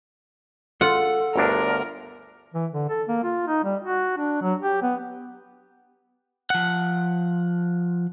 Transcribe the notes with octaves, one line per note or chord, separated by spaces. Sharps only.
F4 A4 F#5
G1 D2 D4 A#4
E3
D3
A4
A#3
F4
D#4
G3
F#4
D4
F#3
G4
B3
F3 F#5